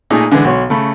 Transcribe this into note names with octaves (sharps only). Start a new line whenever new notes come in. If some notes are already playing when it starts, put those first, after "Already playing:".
A#2 A3 D#4 G#4 D#6
D3 E3 G#3
B1 F#4 C#5 C6
C#3 A3 B5